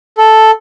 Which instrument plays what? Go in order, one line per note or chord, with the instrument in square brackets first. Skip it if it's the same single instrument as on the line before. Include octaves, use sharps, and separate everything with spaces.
[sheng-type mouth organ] A4